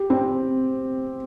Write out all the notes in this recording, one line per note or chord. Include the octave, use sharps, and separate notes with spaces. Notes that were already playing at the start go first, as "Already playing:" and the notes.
Already playing: G4
C4